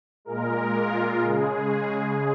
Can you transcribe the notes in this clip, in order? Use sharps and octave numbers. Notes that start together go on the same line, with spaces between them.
A#2 G#3 A#4
F4
C#3 G#3 G#4